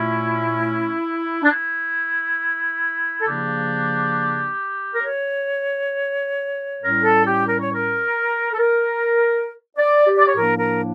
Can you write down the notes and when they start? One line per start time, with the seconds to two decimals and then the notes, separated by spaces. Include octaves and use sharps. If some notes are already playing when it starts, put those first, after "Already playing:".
Already playing: A#2 A3 C#4 E4
1.43 D4
1.48 E4
3.20 A4
3.26 C#3 F3 A#3 D4 G4
4.93 A#4
5.04 C#5
6.81 A2 G3 C#4 A#4
7.03 A4
7.26 G4
7.48 A#4
7.60 C#5
7.74 A#4
8.53 A4
8.59 A#4
9.77 D5
10.07 G4
10.17 D5
10.27 C#5
10.36 A2 F3 A#3 D4 A#4
10.59 A#4